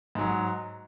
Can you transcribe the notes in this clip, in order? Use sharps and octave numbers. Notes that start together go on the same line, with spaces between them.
G#2 F#3